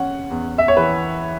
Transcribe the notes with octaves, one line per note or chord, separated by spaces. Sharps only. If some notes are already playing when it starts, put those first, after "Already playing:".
Already playing: C#4 F#5
E2
E5
C#5
E3 B4